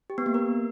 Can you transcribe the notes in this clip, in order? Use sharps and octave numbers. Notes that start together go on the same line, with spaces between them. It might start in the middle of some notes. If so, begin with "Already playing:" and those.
G4
B3
A#3
A#4